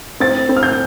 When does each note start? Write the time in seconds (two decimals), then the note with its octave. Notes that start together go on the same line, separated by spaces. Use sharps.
0.20 C4 A6
0.49 C4
0.57 F6
0.63 G6